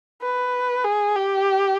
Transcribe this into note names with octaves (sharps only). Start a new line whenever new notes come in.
B4
G#4
G4